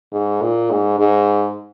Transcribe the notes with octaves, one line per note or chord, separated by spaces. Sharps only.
G#2
A#2
G#2
G#2